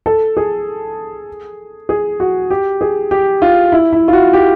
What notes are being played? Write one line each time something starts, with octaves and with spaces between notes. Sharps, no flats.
A4
G#4
G#4
F#4
G4
G#4
G4
F4
E4
E4
F4
F#4
G4